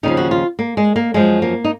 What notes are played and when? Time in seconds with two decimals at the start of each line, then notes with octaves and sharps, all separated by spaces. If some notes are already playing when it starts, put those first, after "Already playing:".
0.03 D#2 C#3 F3 D#4
0.17 F#4
0.31 F4
0.59 A#3
0.77 G#3
0.96 A#3
1.14 F#2 F3 G#3
1.42 A#3
1.64 D#4